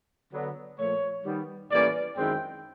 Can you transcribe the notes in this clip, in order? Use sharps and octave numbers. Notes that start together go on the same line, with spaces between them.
D3 F#3 B3
A#2 F3 A3 C#5
D#3 G3 B3
A2 E3 G3 A#3 C#4 D5
F#2 D#3 G#3 C4 E4 G5